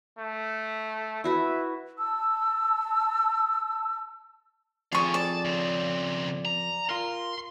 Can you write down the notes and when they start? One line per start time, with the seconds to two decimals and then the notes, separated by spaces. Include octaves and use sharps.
0.18 A3
1.24 E4 F#4 B4 E5
1.98 A5 E6
4.93 F2 G#4 D5 F5 G#5 C#6
5.14 D5 A5
5.45 C#3 C4
6.45 A#5
6.89 F4 A#4 C6